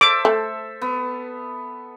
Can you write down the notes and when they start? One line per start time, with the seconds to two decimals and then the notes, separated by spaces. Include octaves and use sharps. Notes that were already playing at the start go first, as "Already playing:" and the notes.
0.01 A4 C5 E5 D6
0.25 A3
0.82 B3